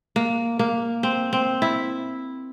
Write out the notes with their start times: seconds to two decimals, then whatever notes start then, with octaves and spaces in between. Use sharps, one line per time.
0.16 A#3
0.59 A#3
1.03 C4
1.33 C4
1.62 E4